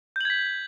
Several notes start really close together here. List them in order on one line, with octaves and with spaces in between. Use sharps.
G6 F#7 G#6 B6